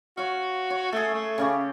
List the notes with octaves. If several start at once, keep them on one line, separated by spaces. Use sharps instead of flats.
F#4 C#5 F5
C#5
A3 G#4 A4
A3
C#3 C#4 G4